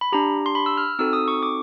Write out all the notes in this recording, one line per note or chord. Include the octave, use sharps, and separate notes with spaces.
B5
D4 G4 A#5
C6
B5
E6
F6
C4 D#4 F#4 A4 E6
D#6
C#6
D6